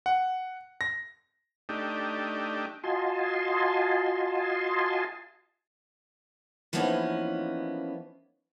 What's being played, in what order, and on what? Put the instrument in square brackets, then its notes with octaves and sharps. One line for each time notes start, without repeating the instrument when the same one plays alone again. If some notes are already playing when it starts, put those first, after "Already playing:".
[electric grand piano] F#5
A#6
[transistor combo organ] A3 D4 D#4 G4
[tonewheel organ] F4 F#4 D#5 G#5 A5 C6
[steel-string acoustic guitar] E3 F3 A#3 B3 C#4 D#4